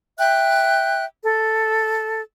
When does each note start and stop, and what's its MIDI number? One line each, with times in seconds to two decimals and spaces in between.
0.18 1.05 76
0.18 1.05 79
0.18 1.05 90
1.22 2.20 69